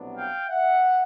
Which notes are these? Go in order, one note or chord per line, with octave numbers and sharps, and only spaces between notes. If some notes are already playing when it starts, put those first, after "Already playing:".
Already playing: C2 B2 F#3 B3 D4
F5 G5
E5 F#5